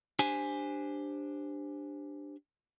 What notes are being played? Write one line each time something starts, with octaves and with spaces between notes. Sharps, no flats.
D4 G4 C5 G#5